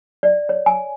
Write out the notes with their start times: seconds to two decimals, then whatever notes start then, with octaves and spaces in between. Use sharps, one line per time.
0.23 D5
0.49 C#5
0.66 G#5